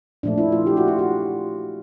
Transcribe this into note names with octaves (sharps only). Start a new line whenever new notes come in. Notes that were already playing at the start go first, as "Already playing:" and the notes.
A#2 F3 A3 D4
E4
F4
G4
F#4
F4
F#4